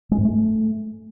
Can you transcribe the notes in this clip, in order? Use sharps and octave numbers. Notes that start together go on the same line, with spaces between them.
G#3
G#2
A3